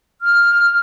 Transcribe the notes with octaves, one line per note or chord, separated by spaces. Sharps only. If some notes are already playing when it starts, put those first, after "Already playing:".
F6